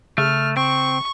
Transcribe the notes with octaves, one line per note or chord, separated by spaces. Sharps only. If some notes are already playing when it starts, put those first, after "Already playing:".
C#3 A3 F6
C4 C#6